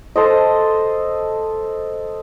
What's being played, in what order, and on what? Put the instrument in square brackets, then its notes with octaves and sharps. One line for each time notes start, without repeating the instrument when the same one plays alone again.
[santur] A4 C5 D#5